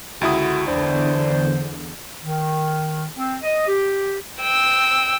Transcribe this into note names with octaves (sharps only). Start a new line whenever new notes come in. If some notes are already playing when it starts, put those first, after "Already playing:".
C#2 D3 E4 F#4 D#6
E2 D3 D4 C5
D#3
C4
D#5
G4
G5 E6